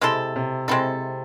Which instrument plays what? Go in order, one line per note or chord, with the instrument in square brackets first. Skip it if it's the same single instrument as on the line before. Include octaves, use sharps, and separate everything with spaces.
[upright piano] C3 [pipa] G#3 C4 E4 A4
[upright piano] C3
[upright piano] C3 [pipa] G#3 C4 E4 A4